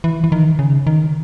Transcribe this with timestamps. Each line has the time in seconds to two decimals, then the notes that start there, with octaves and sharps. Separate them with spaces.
0.04 E3
0.24 E3
0.32 D#3
0.59 C#3
0.87 D#3